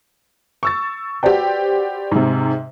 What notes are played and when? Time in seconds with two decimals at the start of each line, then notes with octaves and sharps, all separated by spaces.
0.63 C#6 E6 A6
1.23 F#4 G4 B4 C5 D5 G5
2.11 G#2 C3